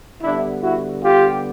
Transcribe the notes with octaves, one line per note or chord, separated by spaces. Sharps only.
D3 G3 B3 D4 E4
E4 F#4
F4 G4